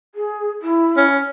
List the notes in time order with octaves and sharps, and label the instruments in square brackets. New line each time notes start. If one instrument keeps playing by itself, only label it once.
[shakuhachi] G#4
E4
[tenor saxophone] C#4